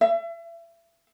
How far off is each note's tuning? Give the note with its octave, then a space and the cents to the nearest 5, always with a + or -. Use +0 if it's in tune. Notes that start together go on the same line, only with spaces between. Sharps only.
E5 +35